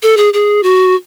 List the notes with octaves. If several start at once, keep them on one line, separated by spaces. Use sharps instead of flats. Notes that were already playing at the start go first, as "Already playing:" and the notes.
A4
G#4
G#4
F#4